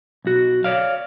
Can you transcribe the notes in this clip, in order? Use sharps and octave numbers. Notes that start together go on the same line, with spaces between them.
B1 F#4
C#5 D5 F5